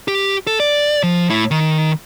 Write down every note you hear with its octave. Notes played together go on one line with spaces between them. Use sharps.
G4
A4
D5
F3
A2 E4
D#3